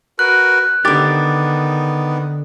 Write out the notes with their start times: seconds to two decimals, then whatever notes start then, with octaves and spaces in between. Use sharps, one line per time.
0.19 F#4 A#4 B4 F#6
0.85 D3 D#3 B3 G4 D6 A6